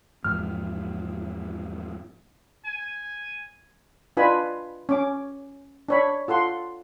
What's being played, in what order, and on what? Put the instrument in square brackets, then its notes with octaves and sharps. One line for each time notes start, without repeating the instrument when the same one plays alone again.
[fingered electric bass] E2 G#2 F3 [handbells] F6
[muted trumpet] G#5
[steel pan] D4 F4 B4 D#5 G#5 B5
C#4 D6
D4 C#5 B5
F4 A4 F#5 C6